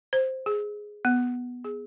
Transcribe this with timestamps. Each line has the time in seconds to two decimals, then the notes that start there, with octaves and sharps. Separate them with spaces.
0.13 C5
0.46 G#4
1.05 B3
1.65 G#4